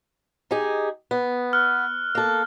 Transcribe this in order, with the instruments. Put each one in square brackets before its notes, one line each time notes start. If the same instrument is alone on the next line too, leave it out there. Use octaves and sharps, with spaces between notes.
[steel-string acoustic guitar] D#4 G4 G#4
B3
[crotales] F6 F#6
[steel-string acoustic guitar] A#3 A4